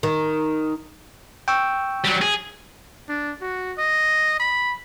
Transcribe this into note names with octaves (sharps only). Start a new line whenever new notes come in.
D#3
G5 C#6 E6
F#3 G3
G#4
D4
F#4
D#5
B5